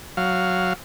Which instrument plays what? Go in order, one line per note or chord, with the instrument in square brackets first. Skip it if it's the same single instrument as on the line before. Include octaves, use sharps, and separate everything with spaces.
[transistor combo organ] F#3 F5